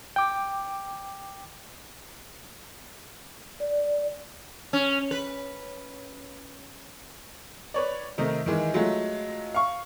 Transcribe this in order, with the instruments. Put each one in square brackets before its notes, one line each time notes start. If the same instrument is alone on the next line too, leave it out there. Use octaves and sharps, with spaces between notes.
[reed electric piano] G5 D6
[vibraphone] D5
[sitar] C#4
B4
[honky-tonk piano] B4 C#5 D5
C3 D#3 A3 D#4
D#3 E3 G#3
F#3 G#3 A3 F4
F5 C#6